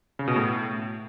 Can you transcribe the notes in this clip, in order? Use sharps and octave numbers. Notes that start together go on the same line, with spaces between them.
C#3
B2
A2